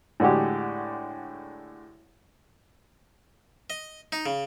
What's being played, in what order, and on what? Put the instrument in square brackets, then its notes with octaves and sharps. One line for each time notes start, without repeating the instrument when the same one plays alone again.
[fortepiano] A2 D3 G#3 F#4 G4
[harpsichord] D#5
D#4
C#3